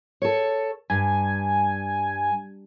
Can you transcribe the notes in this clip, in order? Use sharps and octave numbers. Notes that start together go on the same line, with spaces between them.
A4 C#5
G2 G#5